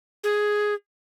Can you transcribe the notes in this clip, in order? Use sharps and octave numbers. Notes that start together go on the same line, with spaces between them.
G#4